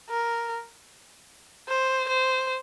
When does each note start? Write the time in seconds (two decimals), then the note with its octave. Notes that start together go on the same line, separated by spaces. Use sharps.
0.10 A#4
1.69 C5
2.09 C5